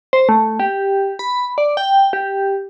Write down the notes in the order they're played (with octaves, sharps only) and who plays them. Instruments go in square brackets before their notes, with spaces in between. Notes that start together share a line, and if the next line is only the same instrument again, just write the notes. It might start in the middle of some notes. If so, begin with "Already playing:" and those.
[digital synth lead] C5
A3
G4
B5
D5
G5
G4